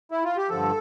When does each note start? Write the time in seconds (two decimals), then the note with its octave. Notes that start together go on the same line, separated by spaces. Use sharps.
0.11 E4
0.24 F4
0.37 G4
0.49 G2 D3 F3 A4